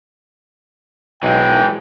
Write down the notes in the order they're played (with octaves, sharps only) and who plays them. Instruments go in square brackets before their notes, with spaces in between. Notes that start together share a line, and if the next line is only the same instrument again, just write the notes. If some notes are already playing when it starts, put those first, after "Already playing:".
[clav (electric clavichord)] B1 D#4 [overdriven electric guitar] E3 G#3 [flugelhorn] G5